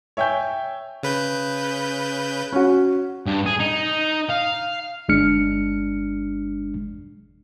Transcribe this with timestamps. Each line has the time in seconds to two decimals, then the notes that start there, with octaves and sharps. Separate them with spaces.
0.17 C#5 E5 G5 G#5 G6
1.03 C#3 B4 G6
2.52 C#4 F#4
3.26 G2
3.46 G#4
3.60 D#4
4.30 F5
5.09 G1 G#3 D4 F6 C#7